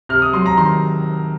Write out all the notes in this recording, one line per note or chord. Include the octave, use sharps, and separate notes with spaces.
C3 F6
D#6
F#3 C6
A#5
D#3 C6